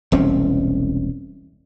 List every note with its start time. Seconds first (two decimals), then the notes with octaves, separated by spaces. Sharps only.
0.12 E1 C2 C4 C#4